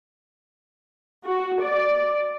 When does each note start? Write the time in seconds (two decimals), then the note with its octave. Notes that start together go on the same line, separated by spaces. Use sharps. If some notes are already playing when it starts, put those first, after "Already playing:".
1.25 F#4
1.62 D5